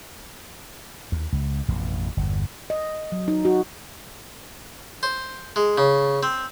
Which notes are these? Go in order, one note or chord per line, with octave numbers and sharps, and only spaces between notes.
D#2
C#2
A1 F2 B2
G1 E2
D#5
F#3
D#4
F#4
C5
G#3
C#3
C4